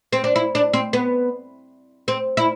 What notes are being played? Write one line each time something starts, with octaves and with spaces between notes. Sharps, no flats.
C4
D4
E4
D4
C4
B3
C4
E4